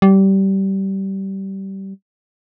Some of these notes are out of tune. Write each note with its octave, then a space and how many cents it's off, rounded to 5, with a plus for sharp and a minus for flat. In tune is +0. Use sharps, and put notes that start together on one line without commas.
G3 -20